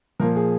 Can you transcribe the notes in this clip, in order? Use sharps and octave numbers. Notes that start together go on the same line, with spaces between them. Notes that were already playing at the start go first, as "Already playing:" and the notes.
A#2 F3 A#4
G#4